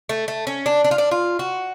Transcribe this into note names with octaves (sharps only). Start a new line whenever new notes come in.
A3
A3
C#4
D4
D4
F4
D4
F4
F#4